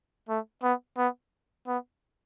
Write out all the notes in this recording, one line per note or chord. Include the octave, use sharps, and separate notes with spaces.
A3
B3
B3
B3